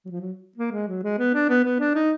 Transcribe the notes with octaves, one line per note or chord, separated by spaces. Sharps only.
F#3
F3
F#3
A#3
G#3
F#3
G#3
B3
D4
B3
B3
D4
D#4